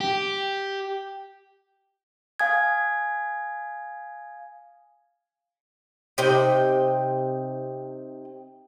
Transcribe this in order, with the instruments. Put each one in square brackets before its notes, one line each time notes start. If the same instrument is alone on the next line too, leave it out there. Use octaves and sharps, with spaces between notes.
[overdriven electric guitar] G4
[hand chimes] F5 G#5 D#6 G#6
[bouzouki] C3 D#4 G5